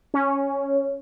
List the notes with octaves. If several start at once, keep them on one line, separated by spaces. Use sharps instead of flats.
C#4